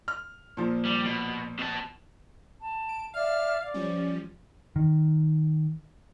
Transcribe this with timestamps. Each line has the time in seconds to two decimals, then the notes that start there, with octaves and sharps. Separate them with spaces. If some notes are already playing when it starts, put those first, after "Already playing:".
0.08 F6
0.57 A#2 F3
0.85 G3
1.05 B2
1.59 B2 A5
2.60 A5
2.89 D7
3.14 D5 E5 F5 F6
3.62 D5
3.74 F3 G3 C#4
4.76 D#3